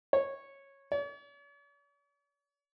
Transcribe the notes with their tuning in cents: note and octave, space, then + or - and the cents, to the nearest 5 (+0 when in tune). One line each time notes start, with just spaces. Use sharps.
C#5 -10
C#5 +45